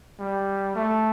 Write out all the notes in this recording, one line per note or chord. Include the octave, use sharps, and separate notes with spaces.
G3
A3